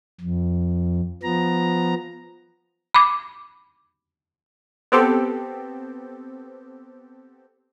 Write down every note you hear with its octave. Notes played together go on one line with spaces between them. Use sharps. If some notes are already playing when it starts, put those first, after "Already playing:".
F2
F3 B3 A#5
B5 D6
B3 C4 G4 A4